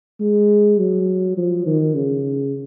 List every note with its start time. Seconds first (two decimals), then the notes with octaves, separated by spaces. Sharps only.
0.20 G#3
0.79 F#3
1.37 F3
1.66 D#3
1.94 C#3